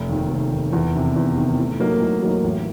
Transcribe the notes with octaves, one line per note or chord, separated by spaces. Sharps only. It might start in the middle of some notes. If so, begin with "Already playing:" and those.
Already playing: F1
D#2 D#3
F1
D#2 D#3
E2
C3 D#3
E2
C3 D#3
A2
F#3 A#3 D#4
A2
F#3 A#3 D#4
A1